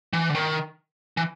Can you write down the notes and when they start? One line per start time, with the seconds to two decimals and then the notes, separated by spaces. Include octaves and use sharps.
0.13 E3
0.30 D3
0.35 D#3
1.17 E3